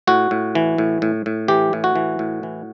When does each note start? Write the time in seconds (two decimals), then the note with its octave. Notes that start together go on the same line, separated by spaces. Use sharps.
0.07 A2 F#4
0.31 A2
0.55 E3
0.78 A2
1.02 A2
1.26 A2
1.48 E3 G4
1.73 A2
1.84 F#4
1.96 E3
2.19 A2
2.43 E3